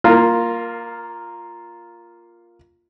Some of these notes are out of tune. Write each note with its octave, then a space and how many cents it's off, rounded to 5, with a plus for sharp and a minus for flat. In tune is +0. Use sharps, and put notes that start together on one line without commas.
A#3 +0 F4 +0 A#4 -30